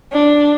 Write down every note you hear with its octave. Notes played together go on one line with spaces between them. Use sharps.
D4